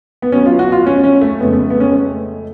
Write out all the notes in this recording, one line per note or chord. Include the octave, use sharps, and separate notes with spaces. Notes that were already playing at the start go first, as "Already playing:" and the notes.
B3
B2 F#3 C#4
F4
F#4
F4
C#4
C#4
A3
F2 C#3 G#3 B3
A3
B3
C#4
A3